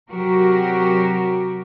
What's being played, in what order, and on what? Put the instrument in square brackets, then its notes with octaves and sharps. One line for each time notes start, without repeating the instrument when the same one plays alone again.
[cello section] C3 F#3 F#4 G4 A#4